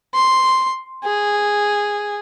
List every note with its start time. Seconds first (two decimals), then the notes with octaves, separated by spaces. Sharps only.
0.14 C6
1.04 G#4